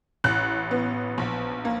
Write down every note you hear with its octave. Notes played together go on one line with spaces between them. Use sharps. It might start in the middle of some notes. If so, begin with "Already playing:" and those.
A1 F#6
B3
A#1
A#3